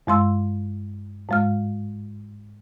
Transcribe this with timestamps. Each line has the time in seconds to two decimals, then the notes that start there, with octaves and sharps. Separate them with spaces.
0.07 G2 G#3 C6 E6
1.29 G#2 G#3 F6